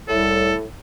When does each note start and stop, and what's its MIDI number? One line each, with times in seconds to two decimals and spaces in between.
0.08 0.52 36
0.08 0.62 45
0.08 0.55 69